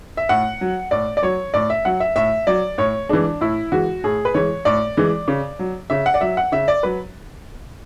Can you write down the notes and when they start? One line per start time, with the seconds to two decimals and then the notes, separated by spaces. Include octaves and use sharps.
0.17 E5
0.29 A2 F#5
0.61 F#3
0.91 A2 D5
1.17 D5
1.22 F#3 C#5
1.54 A2 D5
1.70 E5
1.85 F#3 F#5
2.00 E5
2.16 A2 E5
2.47 F#3 D5
2.78 A2 C#5
3.09 E3 G#3 D4
3.41 A2 E4
3.72 E3 G#3 F#4
4.04 A2 G#4
4.25 B4
4.34 E3 G#3 C#5
4.65 A2 D5
4.97 E3 G#3
5.28 C#3
5.59 F#3
5.90 C#3 E5
6.06 F#5
6.14 D5
6.21 F#3 E5
6.37 F#5
6.52 C#3 E5
6.68 D5
6.83 F#3 B4